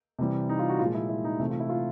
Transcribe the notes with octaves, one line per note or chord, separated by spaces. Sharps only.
C3 E3 G3
D#4
F4
F#4
A#2 F3 G#3 F4
E4
E4
D#4
C3 E3 A3 E4
F4
E4
F4